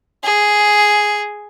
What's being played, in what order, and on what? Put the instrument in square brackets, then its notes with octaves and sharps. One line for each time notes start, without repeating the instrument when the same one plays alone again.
[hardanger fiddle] G#4